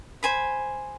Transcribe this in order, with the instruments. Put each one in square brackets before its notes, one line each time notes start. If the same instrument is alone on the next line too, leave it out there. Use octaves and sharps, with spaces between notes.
[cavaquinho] C5 G#5 B5